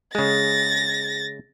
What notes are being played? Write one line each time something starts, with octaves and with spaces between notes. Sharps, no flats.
C#3 G#3 A6 A#6